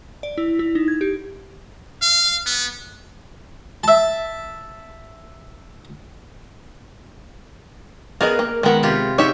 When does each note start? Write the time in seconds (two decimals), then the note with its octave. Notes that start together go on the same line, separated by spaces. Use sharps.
0.23 D5
0.38 E4
0.59 E4
0.75 D#4
0.88 G#6
1.01 G4
2.02 F5
2.46 B3
3.84 E5 A5
8.21 B3 G#4 A#4 D#5
8.39 A#3
8.63 D#3 G#3 B3 A#4 F#5
8.83 C3 F4 G4
9.18 D#4 G4 G#4 C#5 E5